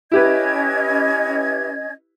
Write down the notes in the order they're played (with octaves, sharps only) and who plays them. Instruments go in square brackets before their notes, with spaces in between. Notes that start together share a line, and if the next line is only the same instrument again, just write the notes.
[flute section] C#4 D#5 G#6 [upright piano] E4 G4 B4